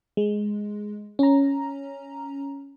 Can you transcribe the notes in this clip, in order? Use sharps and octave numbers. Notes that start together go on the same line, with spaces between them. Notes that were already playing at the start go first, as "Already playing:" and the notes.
G#3
C#4 A#5